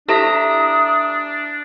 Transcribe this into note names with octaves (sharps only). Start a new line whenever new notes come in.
D4 E4 G4 A4 E5 A#5 D#6